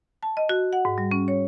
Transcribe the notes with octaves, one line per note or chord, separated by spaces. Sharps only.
A5
D#5
F#4
F#5
G#2
G3
C#4
C#5